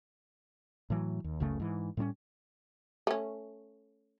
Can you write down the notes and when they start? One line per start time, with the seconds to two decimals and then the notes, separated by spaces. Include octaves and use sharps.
0.90 A2 E3 F#3
1.24 D#2
1.40 F#1 C#2 C#3 A3
1.60 G#2 E3
1.97 A2 G3 C4 C#4
3.07 A3 C#4